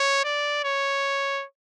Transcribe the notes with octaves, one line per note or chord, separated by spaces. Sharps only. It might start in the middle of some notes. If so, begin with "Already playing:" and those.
Already playing: C#5
D5
C#5